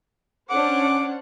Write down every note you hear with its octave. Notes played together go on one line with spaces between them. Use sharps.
C#4 D4 C5 F#5 D6